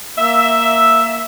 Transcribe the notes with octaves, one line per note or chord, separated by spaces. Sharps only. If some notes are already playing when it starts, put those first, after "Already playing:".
A#3 E5